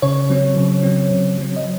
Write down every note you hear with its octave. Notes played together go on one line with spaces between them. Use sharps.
C#3 C#5
F#3 C4
C#3
F#3 C4
C#3
F#3 C4
D#5